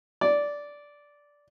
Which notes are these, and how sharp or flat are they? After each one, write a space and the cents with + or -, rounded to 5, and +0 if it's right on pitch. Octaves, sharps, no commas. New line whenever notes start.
D5 -10